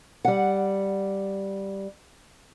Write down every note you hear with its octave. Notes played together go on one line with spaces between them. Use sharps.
G3 F#5